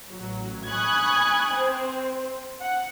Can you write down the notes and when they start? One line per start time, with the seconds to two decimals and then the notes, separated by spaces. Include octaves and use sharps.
0.10 A1 F#3
0.68 G#5 B5 C#6 D#6 F#6 G#6
1.53 C4 C5
2.60 F#5